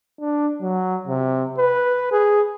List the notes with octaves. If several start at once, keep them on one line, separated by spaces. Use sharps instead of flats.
D4
F#3
C3
B4
G#4